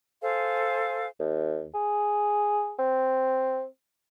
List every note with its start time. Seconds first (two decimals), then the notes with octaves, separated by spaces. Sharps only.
0.22 A4 C5 F5 G#5
1.20 D#2
1.74 G#4
2.79 C4